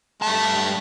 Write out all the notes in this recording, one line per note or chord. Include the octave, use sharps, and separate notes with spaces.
G2 A3 A5